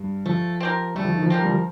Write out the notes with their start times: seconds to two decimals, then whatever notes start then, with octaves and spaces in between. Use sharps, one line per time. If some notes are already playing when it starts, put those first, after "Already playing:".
Already playing: G2
0.26 F3 A3
0.60 C4 G4 A#4
0.95 G3 A3
1.05 F3
1.14 D#3
1.23 F3
1.30 C4 G4 A#4
1.42 G3
1.50 F3